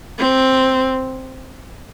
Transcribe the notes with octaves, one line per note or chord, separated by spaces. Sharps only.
C4